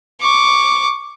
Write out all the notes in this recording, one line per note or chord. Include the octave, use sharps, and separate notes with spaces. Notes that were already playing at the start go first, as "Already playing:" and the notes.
C#6 D6